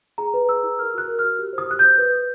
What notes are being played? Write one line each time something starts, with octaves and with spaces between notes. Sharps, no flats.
G#4 A#5
B4
G#4 E6
E4
A#4 F6
F#4 F#6
A#4
F6
F#4
G4
C5
D#6
G4 F#6
G6
C5
B4
B4